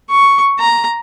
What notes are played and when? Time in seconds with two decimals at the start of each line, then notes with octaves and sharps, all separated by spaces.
0.11 C#6
0.59 A#5